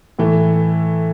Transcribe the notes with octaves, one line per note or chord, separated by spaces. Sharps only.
A2 E3 A3